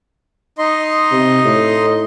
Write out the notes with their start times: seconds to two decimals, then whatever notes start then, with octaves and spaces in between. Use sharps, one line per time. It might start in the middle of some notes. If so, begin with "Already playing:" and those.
0.58 D#4 D#5 C6
1.12 C3
1.45 A2